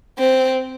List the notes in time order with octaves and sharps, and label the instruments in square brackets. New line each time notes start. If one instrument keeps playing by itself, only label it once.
[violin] C4